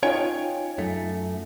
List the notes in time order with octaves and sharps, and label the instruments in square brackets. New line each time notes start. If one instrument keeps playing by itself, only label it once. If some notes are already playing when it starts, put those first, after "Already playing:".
[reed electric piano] C#4 D#4 F4 [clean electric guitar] C#5 G5 G#5
[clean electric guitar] F#2 A3